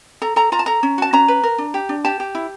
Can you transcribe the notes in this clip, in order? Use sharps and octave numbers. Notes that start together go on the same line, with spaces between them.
A4 A#5
A4 A#5
F4 A#5
A5
A4 A#5
C#4
F#4 A5
C#4 A#5
B4
A#4
D4
G4
D4
G4 A5
G4
E4